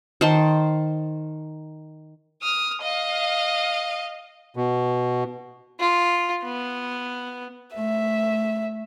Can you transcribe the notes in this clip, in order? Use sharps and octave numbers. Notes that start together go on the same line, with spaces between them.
D#3 C5 A5
D#6 F6
D#5 F5
B2
F4
B3
A3 E5